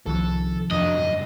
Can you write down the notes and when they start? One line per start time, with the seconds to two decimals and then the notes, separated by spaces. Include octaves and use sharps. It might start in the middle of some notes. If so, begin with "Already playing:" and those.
0.06 C2 C3 D#3 F3 A4
0.71 F2 F#3 D4 D#5
0.97 C#2 G2